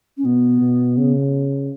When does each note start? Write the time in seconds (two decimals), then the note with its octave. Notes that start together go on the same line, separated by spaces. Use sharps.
0.18 C#4
0.24 B2 B3
0.61 B2
0.98 C#3